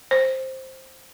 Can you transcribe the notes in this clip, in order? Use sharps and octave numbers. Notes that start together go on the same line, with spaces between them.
C5